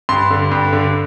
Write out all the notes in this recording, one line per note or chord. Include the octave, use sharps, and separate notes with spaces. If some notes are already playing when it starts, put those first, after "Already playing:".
G2 C6
D3
G2
D3